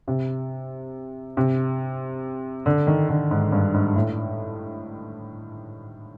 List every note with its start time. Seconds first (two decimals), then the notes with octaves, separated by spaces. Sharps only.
0.08 C3
1.37 C3
2.66 D3
2.87 D#3
3.09 D3
3.31 G#2
3.52 G2
3.74 G#2
3.96 A2